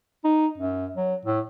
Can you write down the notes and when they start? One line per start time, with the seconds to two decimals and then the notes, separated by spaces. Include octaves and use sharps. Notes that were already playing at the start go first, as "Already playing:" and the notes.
0.24 D#4
0.58 F#2
0.97 F#3
1.26 A2